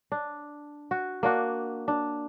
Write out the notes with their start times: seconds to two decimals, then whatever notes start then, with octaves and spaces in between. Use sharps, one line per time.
0.12 D4
0.91 F#4
1.23 A#3 D4 F#4
1.88 D4